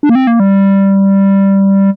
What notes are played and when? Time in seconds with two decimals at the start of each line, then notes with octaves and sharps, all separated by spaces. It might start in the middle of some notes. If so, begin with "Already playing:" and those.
0.03 D4
0.09 A#3
0.15 C4
0.27 A#3
0.40 G3